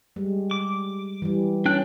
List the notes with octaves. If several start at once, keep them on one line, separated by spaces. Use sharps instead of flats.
G3 G#3
D6
E3 G3
C#4 D4 G5 F#6